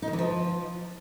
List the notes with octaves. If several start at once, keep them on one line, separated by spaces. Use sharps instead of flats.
D#4
D#3
E3
F3